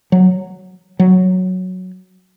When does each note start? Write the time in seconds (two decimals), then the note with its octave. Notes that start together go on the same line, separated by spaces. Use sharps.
0.12 F#3
0.99 F#3